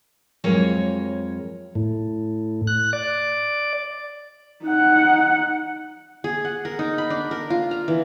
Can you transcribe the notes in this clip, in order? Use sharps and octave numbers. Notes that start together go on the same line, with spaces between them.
F2 F#3 G#3 A#4 C#5
A2
F#6
D5
D#4 F#5
G#4
F#5
A#4
D#4
B5
D4
A#4
F4
A#5
E3